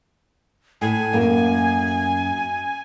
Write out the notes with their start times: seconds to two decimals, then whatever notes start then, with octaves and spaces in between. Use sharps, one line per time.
0.81 A2 G#5
1.13 F#2 A#3